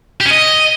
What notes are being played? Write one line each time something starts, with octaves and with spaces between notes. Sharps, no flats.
G4
C#4
D#5